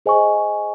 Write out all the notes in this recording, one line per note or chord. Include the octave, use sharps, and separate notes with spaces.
G#4 C5 D#5 G#5 C#6